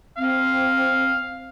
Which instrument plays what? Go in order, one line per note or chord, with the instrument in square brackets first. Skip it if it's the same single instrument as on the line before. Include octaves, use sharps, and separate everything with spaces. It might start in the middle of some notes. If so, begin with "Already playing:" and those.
[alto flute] C4 [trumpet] F5